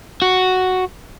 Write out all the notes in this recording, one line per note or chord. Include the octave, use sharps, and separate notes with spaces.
F#4